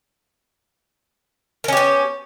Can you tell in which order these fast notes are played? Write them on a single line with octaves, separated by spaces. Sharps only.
A#4 C#4 G4 B3